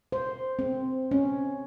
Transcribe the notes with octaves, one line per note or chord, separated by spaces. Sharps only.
C5
C4
C#4